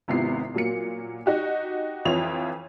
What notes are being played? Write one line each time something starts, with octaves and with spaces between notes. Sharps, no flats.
G#1 C3 B3 E4 F4 C7
A#2 F#3 A#3 C#7
D#4 F#4 G4
F2 E3 F4 C#5 F7